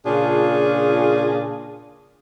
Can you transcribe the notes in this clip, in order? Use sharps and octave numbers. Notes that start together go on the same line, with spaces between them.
A#2 C#3 D4 F4 G#4